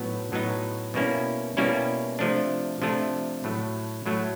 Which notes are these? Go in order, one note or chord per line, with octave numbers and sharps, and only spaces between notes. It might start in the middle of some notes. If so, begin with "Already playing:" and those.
Already playing: A2 F#3 B3 D#4
A2 F#3 B3 D#4
B2 G3 A#3 C#4 E4
B2 G3 A#3 C#4 E4
C3 F3 A3 D4
C3 F3 A3 D4
A2 F#3 A3
A2 F#3 A3